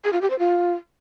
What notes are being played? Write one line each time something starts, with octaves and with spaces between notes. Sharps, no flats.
G#4
F4
G4
C5
F4